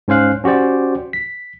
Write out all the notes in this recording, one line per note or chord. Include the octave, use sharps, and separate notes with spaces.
G#2 C#4 C5 F5 F#6
C#4 F#4 G4 C5 D5
B6